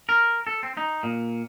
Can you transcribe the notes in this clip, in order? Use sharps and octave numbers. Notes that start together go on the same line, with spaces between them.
A#4
A4
C4
D#4
A#2